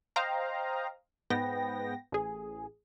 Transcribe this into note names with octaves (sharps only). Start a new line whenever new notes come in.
C5 D#5 F5 G5 A#5
G#2 B3 G5 A#6
A1 G#4